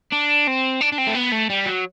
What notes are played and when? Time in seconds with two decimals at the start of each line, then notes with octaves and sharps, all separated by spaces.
0.12 D4
0.48 C4
0.81 D4
0.93 D4
0.98 C4
1.07 A3
1.15 B3
1.32 A3
1.50 G3
1.66 F#3